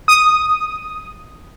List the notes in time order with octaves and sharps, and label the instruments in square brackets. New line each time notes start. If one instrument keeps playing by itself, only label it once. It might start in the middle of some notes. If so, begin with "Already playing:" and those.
[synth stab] D#6